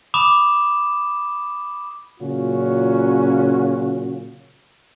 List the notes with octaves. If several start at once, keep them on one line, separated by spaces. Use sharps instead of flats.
B5 D6 D#6 E7
A#2 C#3 F#3 C#4 F4 F#4